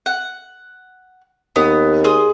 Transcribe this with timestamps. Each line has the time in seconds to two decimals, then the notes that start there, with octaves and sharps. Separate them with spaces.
0.06 F#5
1.56 D#2 B3 D#6
2.04 G#4 C6 D#6